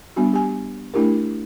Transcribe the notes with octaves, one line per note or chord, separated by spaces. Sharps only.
G3 B3 D4 F#4
G4 G#5
A3 D4 E4 G4 A#4